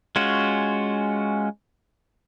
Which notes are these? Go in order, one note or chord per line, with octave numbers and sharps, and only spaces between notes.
G#3 C#4 F4 F#4